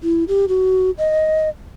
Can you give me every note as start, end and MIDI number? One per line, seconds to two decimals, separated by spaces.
0.03 0.24 64
0.28 0.46 67
0.49 0.91 66
0.98 1.49 75